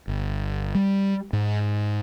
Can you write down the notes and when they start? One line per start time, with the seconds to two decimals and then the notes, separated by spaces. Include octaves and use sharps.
0.08 G1
0.75 G3
1.33 G#2